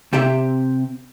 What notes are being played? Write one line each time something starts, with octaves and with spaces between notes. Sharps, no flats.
C3 C4 G4 E5